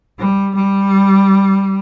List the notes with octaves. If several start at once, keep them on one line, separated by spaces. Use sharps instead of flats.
G3
G3